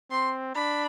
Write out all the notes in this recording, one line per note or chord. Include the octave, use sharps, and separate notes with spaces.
C4 C6
D4 B5